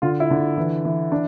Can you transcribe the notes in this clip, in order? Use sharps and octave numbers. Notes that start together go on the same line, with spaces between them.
D3 F4
E4
D3
E3
E3
D4